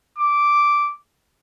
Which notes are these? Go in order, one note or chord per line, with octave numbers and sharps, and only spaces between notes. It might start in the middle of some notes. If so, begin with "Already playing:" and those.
D6